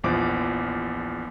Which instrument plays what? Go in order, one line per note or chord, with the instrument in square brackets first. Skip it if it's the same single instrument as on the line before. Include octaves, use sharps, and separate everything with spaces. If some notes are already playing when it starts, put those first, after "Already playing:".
[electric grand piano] A#1 E2 F3 D6